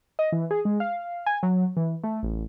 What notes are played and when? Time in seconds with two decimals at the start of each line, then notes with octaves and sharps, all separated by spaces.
0.19 D#5
0.32 E3
0.51 G#4
0.65 G#3
0.80 F5
1.26 G#5
1.43 F#3
1.77 E3
2.04 A3
2.23 A1